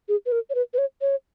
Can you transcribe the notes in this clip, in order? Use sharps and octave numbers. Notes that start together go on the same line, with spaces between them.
G#4
B4
A#4
C#5
B4
B4
C#5
C#5